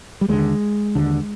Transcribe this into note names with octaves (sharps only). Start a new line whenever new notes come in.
G3
D#2 D3 G#3
D#2 D3